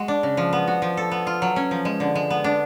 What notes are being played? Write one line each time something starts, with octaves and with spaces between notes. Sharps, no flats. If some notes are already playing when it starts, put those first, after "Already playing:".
Already playing: G#3 F#4
D4
C#3
F3
B3
F#4
F3
A4
B3
F4
F#3
C#4
F3
G#3
D3
G#3
B3
D4